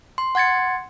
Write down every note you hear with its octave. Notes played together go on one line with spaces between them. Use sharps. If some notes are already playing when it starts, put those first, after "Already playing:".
C6
F#5 C6 G#6 A6 C#7